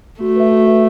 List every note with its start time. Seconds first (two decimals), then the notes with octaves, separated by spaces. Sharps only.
0.20 A3 F#4
0.36 B4 E5
0.52 F#4
0.67 B4 E5